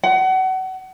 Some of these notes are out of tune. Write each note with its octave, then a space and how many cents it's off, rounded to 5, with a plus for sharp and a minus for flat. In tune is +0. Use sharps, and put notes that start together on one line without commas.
F#5 +30